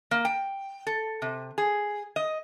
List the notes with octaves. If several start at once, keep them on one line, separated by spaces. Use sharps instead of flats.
A#3
G5
A4
C3
G#4
D#5